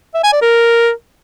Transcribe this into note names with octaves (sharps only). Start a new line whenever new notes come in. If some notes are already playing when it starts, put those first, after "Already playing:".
E5
G#5
D5
A#4